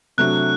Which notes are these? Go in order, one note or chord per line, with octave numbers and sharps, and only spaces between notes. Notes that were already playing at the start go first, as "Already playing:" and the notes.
C3 F#3 A3 D4 F#4 F#6